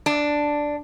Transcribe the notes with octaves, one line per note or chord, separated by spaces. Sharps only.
D4